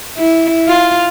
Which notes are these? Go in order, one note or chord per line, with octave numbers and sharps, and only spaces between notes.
E4
F4